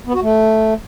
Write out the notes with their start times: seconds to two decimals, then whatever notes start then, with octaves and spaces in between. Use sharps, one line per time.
0.07 B3
0.14 F#4
0.22 A3